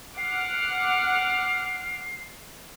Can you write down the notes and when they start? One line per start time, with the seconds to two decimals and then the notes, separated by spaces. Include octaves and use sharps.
0.18 F#5 D6 F6 C7